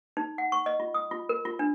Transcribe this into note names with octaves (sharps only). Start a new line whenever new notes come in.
D#4
F#5
C#6
D#5
F4
D#6
F4
A#4
F4
D4